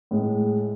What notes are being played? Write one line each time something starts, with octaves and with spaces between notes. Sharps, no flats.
A2 G#3